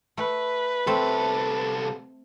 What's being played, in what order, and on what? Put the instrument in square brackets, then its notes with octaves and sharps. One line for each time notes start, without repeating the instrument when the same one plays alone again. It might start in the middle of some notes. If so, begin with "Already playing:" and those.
[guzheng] A3 [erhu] B4
[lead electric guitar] C2 A4 [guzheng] A3 C4